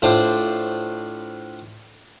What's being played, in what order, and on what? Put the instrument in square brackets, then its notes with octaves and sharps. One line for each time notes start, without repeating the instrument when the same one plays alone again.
[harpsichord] A2 D4 F4 C5 D5 D6